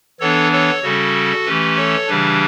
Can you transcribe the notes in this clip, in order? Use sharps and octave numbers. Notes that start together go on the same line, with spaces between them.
E3 B3 D4 A4 C#5
A4 C#5
C#3 G3 C#4 F#4 A4
E3 A3 C#4 G4 B4
A4 C#5
C#3 E3 G3 D4 G4 B4